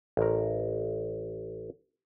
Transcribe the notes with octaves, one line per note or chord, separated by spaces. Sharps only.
A1 A#4